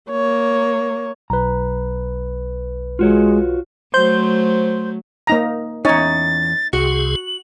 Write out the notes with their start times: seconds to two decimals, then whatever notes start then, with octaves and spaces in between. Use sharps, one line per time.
0.10 A#3 C#5
1.30 B1 B4 A#5
2.99 G#3 F4 F#4 C#5
3.94 F#3 A3 C5 G6
5.27 A#3 D#4 A#5
5.85 E2 C#4 D#4 C#5 A6
6.73 C2 C3 F#4 G#4 F#7